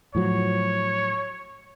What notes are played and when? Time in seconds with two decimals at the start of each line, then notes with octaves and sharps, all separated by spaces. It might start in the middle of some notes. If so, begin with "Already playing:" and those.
0.15 A2 F3 F#3 C#5